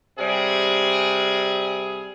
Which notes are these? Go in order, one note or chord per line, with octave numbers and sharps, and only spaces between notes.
C3 G3 G#4